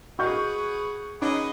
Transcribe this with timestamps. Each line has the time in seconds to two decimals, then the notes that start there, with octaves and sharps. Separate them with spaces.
0.19 F#4 G#4 B4 D#5 F5 F#5 C#6 G6
1.22 C#4 D#4 G#4 B4 D#5 F#5 D6